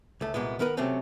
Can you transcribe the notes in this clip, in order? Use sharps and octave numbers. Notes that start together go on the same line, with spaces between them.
C#2 A3
C2 A#2 G#3 B3
D#3 B3 A#4 B4
C3 F#3 A3 C4 C#4